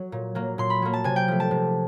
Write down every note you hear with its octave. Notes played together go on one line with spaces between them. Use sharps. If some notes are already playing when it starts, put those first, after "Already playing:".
Already playing: F#3
A#2
F#3 A#3
A#2 C6
B5
F#3 A#3
A5
C3 G#5
G5
F3 A3
A5
C3